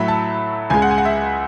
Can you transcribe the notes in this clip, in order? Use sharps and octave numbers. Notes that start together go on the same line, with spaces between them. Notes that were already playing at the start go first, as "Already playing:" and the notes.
Already playing: A2 F#3 A3 E5 B5
A5
C#2 C#3 G#3 G#5
F#5
G#5
F#5
E5